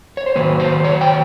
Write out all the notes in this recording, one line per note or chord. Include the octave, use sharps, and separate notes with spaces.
C#5
C5
D#3 F#3 A#3 B4
C5
C#5
G5